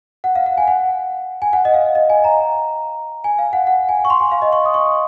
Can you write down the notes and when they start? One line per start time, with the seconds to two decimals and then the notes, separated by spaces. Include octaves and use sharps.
0.24 F#5
0.35 F5
0.46 F#5
0.58 G#5
0.68 F#5
1.42 G#5
1.53 F#5
1.65 D#5
1.74 F5
1.95 D#5
2.10 G#5
2.24 A#5
3.24 G#5
3.38 F5
3.53 F#5
3.67 F#5
3.89 G#5
4.05 C#6
4.10 C6
4.20 G#5
4.31 F5
4.42 D#5
4.52 C#6
4.65 D#6
4.74 C#6